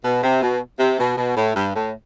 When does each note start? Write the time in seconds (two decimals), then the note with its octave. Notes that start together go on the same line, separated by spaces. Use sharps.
0.04 B2
0.23 C3
0.42 B2
0.80 C3
0.99 B2
1.18 B2
1.37 A2
1.56 G2
1.76 A2